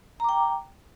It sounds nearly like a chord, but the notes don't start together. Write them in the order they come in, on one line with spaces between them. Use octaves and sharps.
A#5 D6 G5